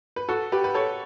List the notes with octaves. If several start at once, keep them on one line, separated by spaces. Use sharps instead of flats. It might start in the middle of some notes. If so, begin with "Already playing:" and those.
B4
F#4 A4
G4 B4
B4
A4 C#5